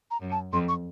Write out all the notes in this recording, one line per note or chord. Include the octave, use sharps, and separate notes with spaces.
A#5
F#2
A5
F2 C6
C#6